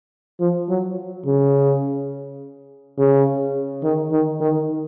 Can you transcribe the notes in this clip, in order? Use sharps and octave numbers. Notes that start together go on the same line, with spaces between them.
F3
F#3
C#3
C#3
D#3
D#3
D#3